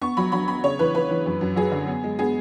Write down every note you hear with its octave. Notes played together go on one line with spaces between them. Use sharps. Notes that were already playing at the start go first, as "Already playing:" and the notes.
B3 C#6
F#3 B5
F#3 B5
B3 B5
C#3 C#5
E3 B4
E3 B4
E3
F#2
F#2
F#3 G#4
D3
B3
G#3
B3 G#4